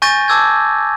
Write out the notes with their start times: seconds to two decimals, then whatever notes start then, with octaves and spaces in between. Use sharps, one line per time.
0.02 G#5 C#6 G6 A6 A#6 D#7
0.28 A5 D6 E6 G6 G#6